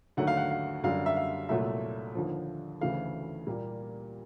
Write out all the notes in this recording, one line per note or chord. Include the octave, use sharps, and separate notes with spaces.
D#2 D3 F#3 A3 F#5
F5
F#5
F5
F#2 D3 G3 F5
E5
F5
C2 A#2 F#3 A3 E5
D#2 D3 F3
D2 C#3 E3 A3 F5
A#2 G3 A#3